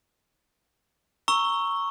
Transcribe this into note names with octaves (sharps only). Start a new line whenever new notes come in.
A#5 C#6 E6 G7